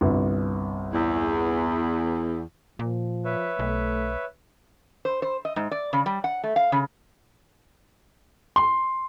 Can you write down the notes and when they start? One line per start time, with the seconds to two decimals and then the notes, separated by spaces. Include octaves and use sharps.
0.01 G1 C2
0.94 E2
2.79 A#2 F3
3.25 B4 C#5 E5
3.59 B1 A3
5.05 C5
5.22 C5
5.45 D#5
5.56 G#2
5.71 D5
5.93 C#3
6.06 G3
6.24 F#5
6.44 A3
6.56 F5
6.72 C#3
8.56 C6